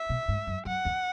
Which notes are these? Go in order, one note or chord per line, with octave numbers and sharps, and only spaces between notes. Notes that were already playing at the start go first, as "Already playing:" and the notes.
Already playing: E5
B2
G#2
F#2
F#2 F#5
E2